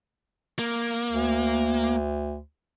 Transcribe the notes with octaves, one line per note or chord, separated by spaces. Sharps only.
A#3
D2